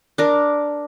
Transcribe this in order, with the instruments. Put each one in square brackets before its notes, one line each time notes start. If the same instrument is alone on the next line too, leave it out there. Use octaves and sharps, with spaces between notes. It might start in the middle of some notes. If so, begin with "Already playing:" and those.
[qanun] D4 A#4